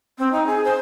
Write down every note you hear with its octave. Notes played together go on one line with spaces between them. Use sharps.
C4
D#4
G#4
C5